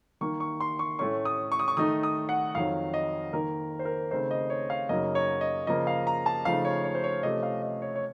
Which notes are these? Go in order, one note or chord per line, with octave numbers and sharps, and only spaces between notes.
D#3 A#3 D#4 C#6
C#6
C6
C#6
A2 A3 C#4 C#6
D#6
C#6
D#6
C#6
D#3 A3 D#4 D#6
D#6
F#5
F2 D#3 F#3 F5
D#5
D#3 A#3 D#4 A#4
C5
A#4
C#3 A3 C4 D#4 C5
D#5
C#5
F5
F#2 C#3 F#3 A#3 D#4 D#5
C#5
D#5
C#3 F3 A#3 D#5
F5
A#5
A5
C#3 F3 A3 D#4 F5
C#5
C#5
C5
C#5
C3 F3 A3 C#4 D#5
F5
D#5
C#5
C#5